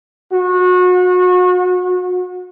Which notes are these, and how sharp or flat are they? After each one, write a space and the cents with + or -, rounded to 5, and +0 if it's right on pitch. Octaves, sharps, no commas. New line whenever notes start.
F#4 -30